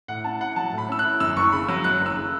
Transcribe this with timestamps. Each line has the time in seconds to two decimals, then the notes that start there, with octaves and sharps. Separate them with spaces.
0.08 A2 F#5
0.24 C#4 A5
0.40 E4 F#5
0.56 F#3 A5
0.72 A2
0.78 B5
0.88 C#4 E6
0.99 F#6
1.05 E4
1.20 F#2 E6
1.36 F#1 C#6
1.52 C#3 B5
1.68 F#3 E6
1.84 F#2 F#6
2.01 F#1
2.06 E6
2.17 C#3